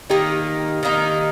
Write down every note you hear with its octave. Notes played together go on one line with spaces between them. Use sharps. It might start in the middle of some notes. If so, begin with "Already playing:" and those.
D#3 A#3 D#4 G4
D#3 A#3 D#4